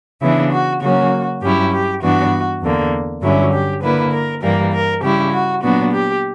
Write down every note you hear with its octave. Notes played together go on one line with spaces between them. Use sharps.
C#3 E3 B3 D4 E4
F#4
C#3 F#3 A#3 C#4 F#4
G2 F#3 C#4 E4 G4
G4
G2 E3 B3 D4 F#4
E2 D3 A#3
G2 D3 F#3 C#4 E4
G4
D3 A#3 E4 B4
A#4
G2 E3 G3 A#3 A#4
A#4
C#3 G3 C#4 E4 G4
F#4
A#2 F#3 B3 D4 F#4
G4